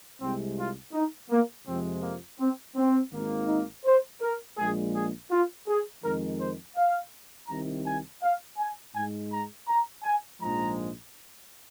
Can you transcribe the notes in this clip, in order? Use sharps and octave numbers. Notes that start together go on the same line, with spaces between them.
C2 C3 G#3 C4
F4
D#4
A#3
F2 C3 F3 G#3 C4
A#3
C4
C4
G#1 G#2 D#3 A#3
D#4
C5
A#4
A#1 A#2 G#3 G#4
G#4
F4
G#4
F2 D#3 G#3 A#4
C5
F5
C2 C3 D#3 A#5
G#5
F5
G#5
G#2 G#3 G#5
A#5
A#5
G#5
A#1 G#2 F3 G#3 A#5